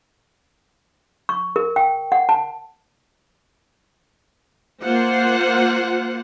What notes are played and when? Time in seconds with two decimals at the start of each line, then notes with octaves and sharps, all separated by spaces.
1.29 C#6
1.56 A#4
1.76 G5
2.12 F#5
2.29 A5
4.82 A#3 F4 C5 F#5